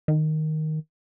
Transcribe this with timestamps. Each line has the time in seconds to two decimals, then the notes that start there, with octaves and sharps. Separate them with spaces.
0.08 D#3